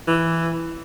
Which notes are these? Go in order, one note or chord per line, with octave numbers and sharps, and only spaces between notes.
E3